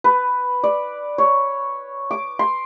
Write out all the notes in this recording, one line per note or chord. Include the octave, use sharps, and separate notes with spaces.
B4
D5
C#5
D6
C6